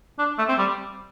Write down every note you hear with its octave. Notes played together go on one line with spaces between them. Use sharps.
D4
A3
C4
G3